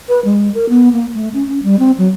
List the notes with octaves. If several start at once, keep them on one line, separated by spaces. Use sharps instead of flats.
B4
G#3
A#4
B3
A#3
A3
C#4
C#4
G3
C4
F#3